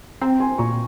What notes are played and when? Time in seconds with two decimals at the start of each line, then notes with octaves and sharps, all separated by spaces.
0.21 C4 G5 A#5
0.40 G#5 C6
0.58 A#2 A#5 C#6